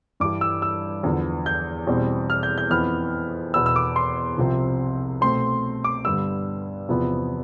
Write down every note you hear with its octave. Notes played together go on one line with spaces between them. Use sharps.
G2 E3 G3 D6
E6
E6
E2 D3 F3 B3
G6
E2 B2 G3 C4
F6
G6
G6
F2 E3 B3 F6
E2 B2 B3 E6
E6
D6
C6
C2 C3 F3 C4
B2 A3 C4 C6
D6
G2 D3 G3 B3 E6
E2 C3 F3 B3